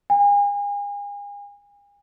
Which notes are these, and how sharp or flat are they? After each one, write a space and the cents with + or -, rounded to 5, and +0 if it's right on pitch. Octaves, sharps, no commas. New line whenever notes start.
G#5 -40